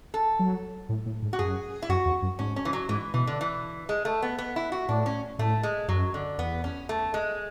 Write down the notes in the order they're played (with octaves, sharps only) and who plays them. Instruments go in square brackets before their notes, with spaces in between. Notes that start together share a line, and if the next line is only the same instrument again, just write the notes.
[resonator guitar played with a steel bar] A4
[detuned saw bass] F#3
A2
A2
G#2
[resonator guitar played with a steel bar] F#4
[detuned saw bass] F#2 [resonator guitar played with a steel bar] G#4
[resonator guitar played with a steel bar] E4
[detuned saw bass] F#2 [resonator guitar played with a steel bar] F#4
[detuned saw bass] E2
F#2
[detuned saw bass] G#2 [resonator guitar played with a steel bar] C#4
[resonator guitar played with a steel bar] C#4
E3
F#3
[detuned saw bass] G#2 [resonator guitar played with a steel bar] E3
[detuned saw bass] B2 [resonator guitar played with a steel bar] E3
[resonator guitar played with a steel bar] D3
E3
G#3
A3
B3
B3
E4
F#4
[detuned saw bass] A2 [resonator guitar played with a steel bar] D4
[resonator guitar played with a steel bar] C#4
[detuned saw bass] A2 [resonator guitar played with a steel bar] A3
[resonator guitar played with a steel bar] G#3
[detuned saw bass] F#2 [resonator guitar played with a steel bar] F#3
[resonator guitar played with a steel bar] D3
[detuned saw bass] E2 [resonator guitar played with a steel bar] B3
[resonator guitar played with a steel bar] C#4
A3
G#3